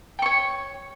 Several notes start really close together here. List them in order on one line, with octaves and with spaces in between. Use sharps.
G5 C#6 C#5